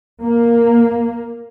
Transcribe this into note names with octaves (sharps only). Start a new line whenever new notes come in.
A#3